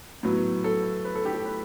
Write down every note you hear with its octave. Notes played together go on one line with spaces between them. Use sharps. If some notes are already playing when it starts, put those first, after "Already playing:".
A2 F#3 B3
A4
B4
A4
G4
A4
B4